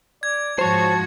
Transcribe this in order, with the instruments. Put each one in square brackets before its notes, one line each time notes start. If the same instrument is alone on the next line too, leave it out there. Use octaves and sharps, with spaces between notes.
[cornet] D5 [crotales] G#6
[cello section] G#2 F3 F#4 [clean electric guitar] C5 C#5 [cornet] A5